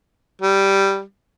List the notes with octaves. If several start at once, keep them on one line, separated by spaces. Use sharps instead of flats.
G3